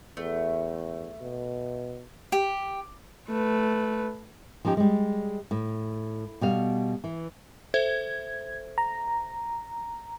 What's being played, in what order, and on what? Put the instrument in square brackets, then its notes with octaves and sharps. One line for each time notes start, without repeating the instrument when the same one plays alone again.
[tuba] E2 [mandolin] A3
[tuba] B2
[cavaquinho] G4
[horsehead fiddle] A3 B4
[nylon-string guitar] F3 C#4 D#4 G4
G3 G#3
A2
B2 G3 F5
E3
[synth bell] A4 C5 E5 [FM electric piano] G#6
[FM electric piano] A#5